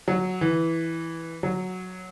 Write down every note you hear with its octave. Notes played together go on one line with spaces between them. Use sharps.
F#3
E3
F#3